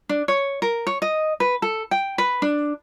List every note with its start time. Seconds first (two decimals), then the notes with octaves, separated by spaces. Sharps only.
0.09 D4
0.28 C#5
0.62 A#4
0.87 C#5
1.02 D#5
1.40 B4
1.62 A4
1.91 G5
2.18 B4
2.42 D4